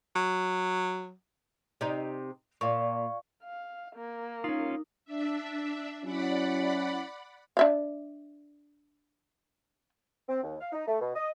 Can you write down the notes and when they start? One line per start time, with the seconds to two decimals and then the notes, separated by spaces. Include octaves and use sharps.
0.16 F#3
1.81 C3 D#4
2.61 A#2 D5 F5 C#6
3.44 F5
3.95 A#3
4.44 C#4 D#4 F4
5.05 D4 E5
6.04 F#3 C#4 E4 D5 F#5 B5
7.57 D4 E5 F5
10.29 C4
10.43 D#2
10.60 F5
10.72 D#4
10.88 A3
11.01 B2
11.15 D#5